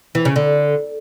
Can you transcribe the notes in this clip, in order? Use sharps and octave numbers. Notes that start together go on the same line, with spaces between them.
E3
C#3
D3